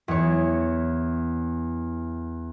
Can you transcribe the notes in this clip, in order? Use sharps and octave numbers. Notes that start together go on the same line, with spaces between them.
E2 C#5